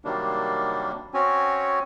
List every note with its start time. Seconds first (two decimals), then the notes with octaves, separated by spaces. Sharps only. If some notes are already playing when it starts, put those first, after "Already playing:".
0.05 C3 D#3 F#3 G3 A#3 D4
1.14 C4 C#4 F#4 C#5 G#5